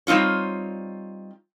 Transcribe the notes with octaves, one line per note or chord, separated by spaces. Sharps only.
G3 C4 D#4 F4 C#5